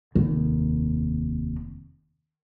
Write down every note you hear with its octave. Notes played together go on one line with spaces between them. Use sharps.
F1 D#2